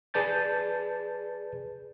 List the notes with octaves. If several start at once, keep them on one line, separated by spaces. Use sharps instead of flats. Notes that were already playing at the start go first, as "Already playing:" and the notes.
G#4 B4 D5 A5 G6 A6